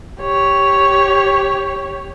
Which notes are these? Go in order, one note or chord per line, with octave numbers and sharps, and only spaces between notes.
G4 C#5